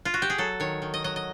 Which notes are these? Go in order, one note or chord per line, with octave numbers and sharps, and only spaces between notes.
F4
F#4
G4
G#4
F#3 A4
D#3 C#5
D#3
D#5
F#3 D#5
D#5